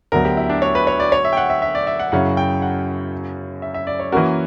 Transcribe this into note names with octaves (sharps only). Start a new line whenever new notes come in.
D2 D3 F#3 B3 A#4
G4
E4
D4
C#5
B4
C#5
D5
C#5
E5
G5
F#5
E5
E5
D5
E5
F#5
F#2 C#3 F#3 C#4 E4 F#5
G5
F#5
E5
E5
D5
C#5
E3 A#3 C#4 F#4 A#4